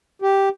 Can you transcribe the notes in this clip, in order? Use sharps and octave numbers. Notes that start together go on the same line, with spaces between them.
G4